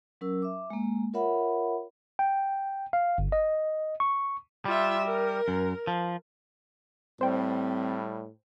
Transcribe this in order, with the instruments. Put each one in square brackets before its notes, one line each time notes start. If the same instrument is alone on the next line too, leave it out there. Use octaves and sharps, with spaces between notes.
[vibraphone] F#3 C#4 A#4 E6
E5 D6
G#3 A#3
F4 A#4 C#5 E5 F#5 B5
[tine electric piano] G5
F5
G1
D#5
C#6
[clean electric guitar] G3 [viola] F4 E5
[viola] A#4
[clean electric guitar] F#2
F3
[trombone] A2 [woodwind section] G3 [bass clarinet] C4 [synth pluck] C5 G5